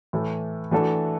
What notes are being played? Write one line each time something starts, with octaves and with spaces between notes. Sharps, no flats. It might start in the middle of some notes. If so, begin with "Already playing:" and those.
A2 E3 A3
E3 A3 D4 F#4 A4